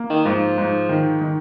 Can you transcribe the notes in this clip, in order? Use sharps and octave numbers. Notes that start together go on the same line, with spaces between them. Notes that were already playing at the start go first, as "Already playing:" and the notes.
Already playing: A#3
D#3
G#2 F3
G#2
D#3
D#3